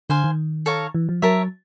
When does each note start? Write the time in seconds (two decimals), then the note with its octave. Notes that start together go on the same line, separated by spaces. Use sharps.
0.10 D3 C5 F5 G#5
0.24 D#3
0.66 A4 C#5 F5 A#5
0.95 E3
1.09 F3
1.22 F#3 A#4 C#5 E5 A5